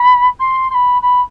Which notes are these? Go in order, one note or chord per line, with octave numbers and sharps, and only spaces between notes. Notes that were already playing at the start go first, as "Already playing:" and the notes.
Already playing: B5
C6
C6
B5
B5